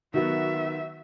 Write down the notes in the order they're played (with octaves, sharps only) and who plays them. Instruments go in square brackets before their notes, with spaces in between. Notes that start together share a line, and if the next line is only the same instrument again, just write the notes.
[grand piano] D#3 F#3 B3 [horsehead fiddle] F#4 E5